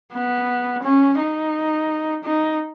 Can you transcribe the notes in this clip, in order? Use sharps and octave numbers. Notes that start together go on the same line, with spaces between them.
B3
C#4
D#4
D#4